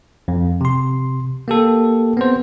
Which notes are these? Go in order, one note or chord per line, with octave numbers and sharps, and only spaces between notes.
F2
C3 C6
A#3 G4 A4
B3 C4 C5